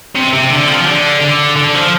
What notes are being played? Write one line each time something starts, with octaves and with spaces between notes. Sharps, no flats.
C3
C3
D3
F3
D3
D3
D3
F3